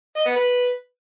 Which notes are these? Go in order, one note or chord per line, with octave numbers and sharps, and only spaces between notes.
D#5
B3
B4